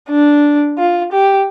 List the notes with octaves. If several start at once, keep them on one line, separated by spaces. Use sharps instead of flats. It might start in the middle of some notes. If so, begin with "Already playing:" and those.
D4
F4
G4